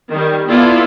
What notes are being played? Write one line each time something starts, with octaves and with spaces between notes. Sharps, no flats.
D#3 G3
B3 E4 F4 A4 D5